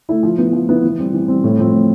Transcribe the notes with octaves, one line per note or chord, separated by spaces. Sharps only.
A3 E4
F3
B3 E4
F3
B3 E4
E3
G3 C4
E3
G3 C4
A2
F3 C4
A2